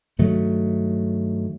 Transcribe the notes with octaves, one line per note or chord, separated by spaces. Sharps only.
G2 D#3 F#3 A3